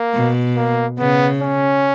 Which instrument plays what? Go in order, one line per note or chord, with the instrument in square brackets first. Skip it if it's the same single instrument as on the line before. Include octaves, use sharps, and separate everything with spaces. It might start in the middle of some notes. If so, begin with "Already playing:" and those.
Already playing: [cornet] A#3
[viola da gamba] B2
[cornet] A#3
[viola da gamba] C#3 [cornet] B3
[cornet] C#4